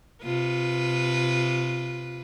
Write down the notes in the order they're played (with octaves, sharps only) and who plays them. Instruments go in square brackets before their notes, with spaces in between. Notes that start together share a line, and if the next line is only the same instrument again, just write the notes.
[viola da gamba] C3 F4 B4